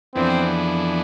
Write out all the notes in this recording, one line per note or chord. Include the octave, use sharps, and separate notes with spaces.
F2 E3 B3 C4 D4